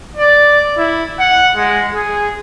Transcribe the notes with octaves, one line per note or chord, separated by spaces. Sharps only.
D5
E4
F#5
G#3
G#4